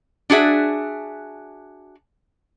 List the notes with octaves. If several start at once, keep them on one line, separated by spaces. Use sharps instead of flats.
D4 F#4 G#4 E5